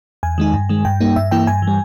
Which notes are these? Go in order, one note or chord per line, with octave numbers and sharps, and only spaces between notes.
E2 G#5
D#3 G#3 D#4
G2
D#3 G#3
G2 G5
G3 A#3 D#4
G2 E5
E3 A#3 E4 G5
G2 G#5
E3
G3